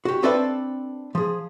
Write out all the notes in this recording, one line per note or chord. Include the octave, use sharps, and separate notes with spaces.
F#4 G4
C4 D4 A4 B4 C5 E5
F3 G#4